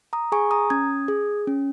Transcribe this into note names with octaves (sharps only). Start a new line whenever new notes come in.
A#5 D#6
G#4 G#5 C#6
A#5 D#6
C#4 D#6 G#6
G#4
C#4